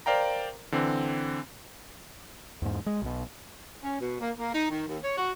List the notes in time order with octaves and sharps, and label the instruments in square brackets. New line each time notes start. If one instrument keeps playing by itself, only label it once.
[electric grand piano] A#4 C5 D5 F5 G5 A#5
D3 E3 C4
[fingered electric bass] E2 G#2
G#3
B1 B2
[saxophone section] C#4
B2
A#3
A#3
D#4
D#3
D#2
C#5
F#4